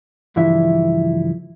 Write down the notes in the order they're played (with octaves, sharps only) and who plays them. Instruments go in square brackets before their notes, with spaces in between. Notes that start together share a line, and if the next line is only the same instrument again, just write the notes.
[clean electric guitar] C#2 G2 E3 F3 E4 E5